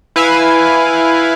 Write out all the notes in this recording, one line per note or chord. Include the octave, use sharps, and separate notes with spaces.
E4 B4 F5 G#5